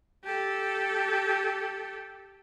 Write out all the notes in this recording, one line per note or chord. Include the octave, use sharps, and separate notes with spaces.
G4 A4